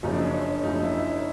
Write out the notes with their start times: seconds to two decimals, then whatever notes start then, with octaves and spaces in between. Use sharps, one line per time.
0.03 F#1 F#2 C#3 F3 D#4
0.12 D4
0.22 C#4
0.31 D4
0.63 F#1 F#2 C#3 F3 D#4
0.84 E4